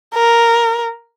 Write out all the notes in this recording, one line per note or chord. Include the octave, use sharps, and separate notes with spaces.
A#4